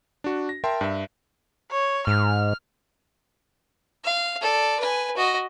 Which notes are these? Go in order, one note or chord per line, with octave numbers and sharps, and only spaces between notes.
D4 F#4
A#6
A#4 E5 G5 A5 C6
G2 E5
C#5
G#2 F6
F5
A4 D5
B4 G#5
F#4 D#5